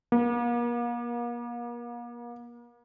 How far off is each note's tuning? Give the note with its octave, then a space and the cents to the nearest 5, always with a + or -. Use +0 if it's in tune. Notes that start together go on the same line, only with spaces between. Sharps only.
A#3 +40